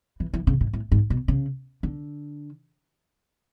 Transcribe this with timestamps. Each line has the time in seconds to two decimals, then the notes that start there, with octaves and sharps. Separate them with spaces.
0.20 E3
0.33 E3
0.47 C#3
0.61 A2
0.73 A2
0.92 G#2
1.10 B2
1.28 C#3
1.83 D3